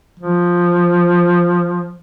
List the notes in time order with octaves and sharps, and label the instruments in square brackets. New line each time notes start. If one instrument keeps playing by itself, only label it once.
[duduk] F3